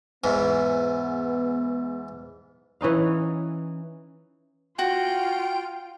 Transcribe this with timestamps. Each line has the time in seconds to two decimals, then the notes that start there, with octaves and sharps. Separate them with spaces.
0.24 E2 G#2 B3
2.81 E3 C#4 D#4 F5
4.79 F4 F#4 G5